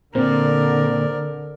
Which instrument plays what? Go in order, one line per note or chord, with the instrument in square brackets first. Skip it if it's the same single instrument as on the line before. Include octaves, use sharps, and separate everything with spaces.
[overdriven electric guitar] A#2 [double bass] D3 [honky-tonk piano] C4 [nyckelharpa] A#4 D5